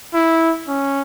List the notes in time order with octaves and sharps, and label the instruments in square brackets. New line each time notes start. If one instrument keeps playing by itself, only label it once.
[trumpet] E4
C#4